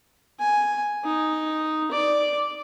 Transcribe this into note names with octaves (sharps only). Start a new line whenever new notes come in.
G#5
D#4
D5